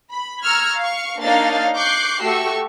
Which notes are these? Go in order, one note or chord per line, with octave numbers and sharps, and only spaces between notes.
B5
A#5 C#6 E6 F6 G#6
F5 C#6
A#3 D4 D#4 C#5 F5 A6
C#6 D6 F#6 G6 C7
A3 F#4 G4 C#6 E6